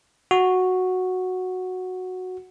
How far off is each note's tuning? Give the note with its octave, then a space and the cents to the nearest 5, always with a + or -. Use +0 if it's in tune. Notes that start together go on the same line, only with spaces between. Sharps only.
F#4 -5